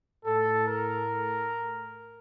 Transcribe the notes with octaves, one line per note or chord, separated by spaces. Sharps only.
A2 A4
A#4